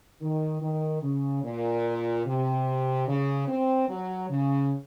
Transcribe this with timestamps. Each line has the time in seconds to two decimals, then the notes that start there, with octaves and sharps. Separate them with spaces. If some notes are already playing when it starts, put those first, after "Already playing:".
0.22 D#3
0.61 D#3
1.02 C#3
1.44 A#2
2.26 C3
3.08 C#3
3.48 C4
3.89 F#3
4.30 C#3